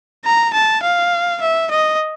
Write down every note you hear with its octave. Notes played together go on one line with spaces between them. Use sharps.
A#5
A5
F5
E5
D#5